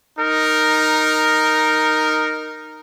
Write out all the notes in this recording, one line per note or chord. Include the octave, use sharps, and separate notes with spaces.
D#4 A#4